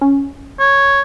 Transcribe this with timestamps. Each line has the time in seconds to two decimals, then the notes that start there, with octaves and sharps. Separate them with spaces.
0.01 C#4
0.59 C#5